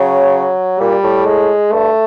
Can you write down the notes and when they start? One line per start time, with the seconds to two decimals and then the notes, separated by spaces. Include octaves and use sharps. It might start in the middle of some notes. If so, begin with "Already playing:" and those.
Already playing: C#3 F#3
0.80 A#2 G3
1.03 A2
1.25 G#3
1.72 G2 A3